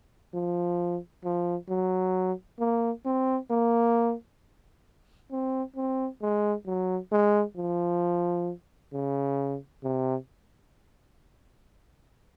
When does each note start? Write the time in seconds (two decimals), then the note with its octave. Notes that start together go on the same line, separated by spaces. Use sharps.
0.34 F3
1.24 F3
1.69 F#3
2.59 A#3
3.06 C4
3.50 A#3
5.31 C4
5.76 C4
6.22 G#3
6.66 F#3
7.12 G#3
7.57 F3
8.93 C#3
9.84 C3